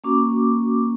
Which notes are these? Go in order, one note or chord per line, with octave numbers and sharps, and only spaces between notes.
A#3 C#4 F#4 D6